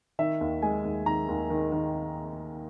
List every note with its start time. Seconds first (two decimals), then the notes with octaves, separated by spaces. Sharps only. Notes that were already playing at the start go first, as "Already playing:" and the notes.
0.19 D#3 E5
0.41 D#2
0.62 G#3 G#5
0.85 D#2
1.06 D#3 A#5
1.29 D#2
1.50 D#3
1.72 D#3